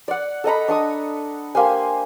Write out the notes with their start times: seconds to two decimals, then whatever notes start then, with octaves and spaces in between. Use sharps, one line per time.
0.08 D5 F#5
0.44 A4 D#5 A#5 B5
0.68 D4 C#6 D#6
1.55 A#3 G4 C5 G#5